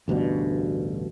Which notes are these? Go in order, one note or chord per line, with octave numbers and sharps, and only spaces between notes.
A1 D2 G2 B2